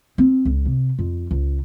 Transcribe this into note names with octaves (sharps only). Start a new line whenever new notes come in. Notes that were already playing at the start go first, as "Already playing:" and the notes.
C4
C#2
C3
F2
C#2